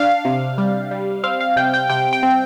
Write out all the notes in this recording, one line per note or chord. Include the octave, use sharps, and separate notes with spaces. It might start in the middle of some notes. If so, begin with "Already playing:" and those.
Already playing: D4 F5
C3
G3
G3
C4 F5
F5
C3 G5
G5
C3 G5
G5
C4